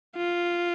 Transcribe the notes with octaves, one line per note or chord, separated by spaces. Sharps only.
F4